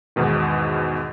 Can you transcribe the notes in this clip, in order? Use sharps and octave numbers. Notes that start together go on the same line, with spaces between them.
E2 G#2 B2 D#3